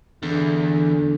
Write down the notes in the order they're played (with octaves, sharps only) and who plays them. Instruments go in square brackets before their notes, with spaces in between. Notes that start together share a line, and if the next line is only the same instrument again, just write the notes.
[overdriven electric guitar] E2 [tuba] D3